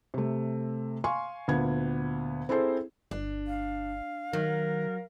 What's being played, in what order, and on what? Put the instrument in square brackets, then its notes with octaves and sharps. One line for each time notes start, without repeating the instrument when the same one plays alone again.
[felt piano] C3 A3
F5 G#5 C6 C#6
D2 A#2 B3 G#6
C4 E4 G#4 A4 C5
[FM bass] G1 [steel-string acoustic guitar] D4
[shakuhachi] F5
[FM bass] D#3 [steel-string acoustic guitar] F#3 [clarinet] A#4